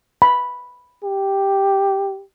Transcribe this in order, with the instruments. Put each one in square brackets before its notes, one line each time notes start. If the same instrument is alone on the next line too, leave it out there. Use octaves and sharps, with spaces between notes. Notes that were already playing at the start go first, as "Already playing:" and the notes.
[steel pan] B5
[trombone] G4